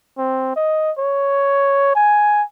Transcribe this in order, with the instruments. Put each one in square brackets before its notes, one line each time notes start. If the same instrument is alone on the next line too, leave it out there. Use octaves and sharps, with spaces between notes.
[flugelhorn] C4
D#5
C#5
G#5